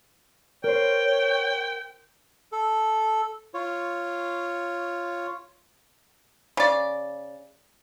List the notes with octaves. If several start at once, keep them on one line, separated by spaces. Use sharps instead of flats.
A#4 C5 C#5 G5
A4
F4 C#5
C#3 D5